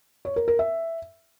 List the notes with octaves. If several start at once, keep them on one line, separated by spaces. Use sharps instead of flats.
C#5
A#4
A#4
E5